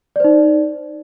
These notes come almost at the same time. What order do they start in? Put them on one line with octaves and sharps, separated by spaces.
D5 C5 D#4